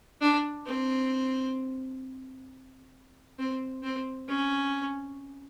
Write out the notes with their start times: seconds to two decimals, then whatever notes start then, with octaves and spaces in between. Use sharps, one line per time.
0.21 D4
0.66 C4
3.39 C4
3.83 C4
4.28 C#4